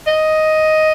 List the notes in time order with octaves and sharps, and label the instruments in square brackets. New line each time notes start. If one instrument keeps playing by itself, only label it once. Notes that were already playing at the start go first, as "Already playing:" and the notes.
[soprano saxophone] D#5